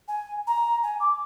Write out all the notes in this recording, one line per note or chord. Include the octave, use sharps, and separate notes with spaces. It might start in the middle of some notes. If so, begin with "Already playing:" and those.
G#5
A#5
G#5
D6